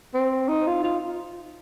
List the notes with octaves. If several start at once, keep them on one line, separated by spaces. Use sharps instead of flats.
C4
D#4
F4
F4